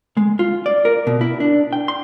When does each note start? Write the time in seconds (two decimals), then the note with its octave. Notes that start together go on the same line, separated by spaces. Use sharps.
0.17 G#3
0.39 F4
0.66 D5
0.85 A#4
1.07 B2
1.21 E4
1.40 D4
1.73 G5
1.88 C6